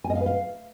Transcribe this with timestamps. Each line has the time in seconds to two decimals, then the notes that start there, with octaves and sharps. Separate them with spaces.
0.04 G#5
0.10 D#5
0.15 F5
0.21 B4
0.26 F5